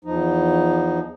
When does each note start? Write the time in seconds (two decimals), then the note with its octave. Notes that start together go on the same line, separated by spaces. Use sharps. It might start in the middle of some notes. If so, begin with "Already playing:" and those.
0.05 E2 F3 D#4